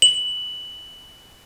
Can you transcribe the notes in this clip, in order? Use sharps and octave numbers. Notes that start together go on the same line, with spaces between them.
F#7